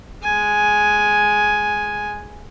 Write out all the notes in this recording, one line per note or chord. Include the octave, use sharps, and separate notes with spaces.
G#3 G#5